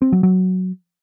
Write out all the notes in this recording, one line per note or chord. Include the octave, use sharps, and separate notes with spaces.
C4
F#3
F#3